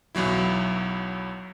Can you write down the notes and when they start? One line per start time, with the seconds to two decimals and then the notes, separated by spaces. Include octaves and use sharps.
0.15 B1 E2 F#3 E4